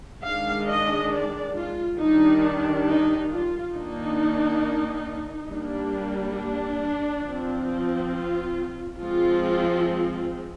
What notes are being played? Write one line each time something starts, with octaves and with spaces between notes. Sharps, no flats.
D#3 G#3 D4 F5
D#5
D5
F4
D#3 G3 D4 D#4
D#4
F4
D#3 A#3 D4 D#4
G3 A#3 D4
D4
F3 C4
F4
F3 G#3 C4 F4